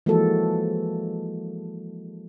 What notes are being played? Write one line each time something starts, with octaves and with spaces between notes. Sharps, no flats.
E3 F3 G#3 A#3 F#4 A4